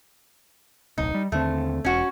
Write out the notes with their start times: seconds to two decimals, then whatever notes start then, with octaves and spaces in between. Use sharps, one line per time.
0.98 D1 B1 D#4
1.14 G3
1.32 D#2 D3 A3 C4
1.85 E1 C#4 F#4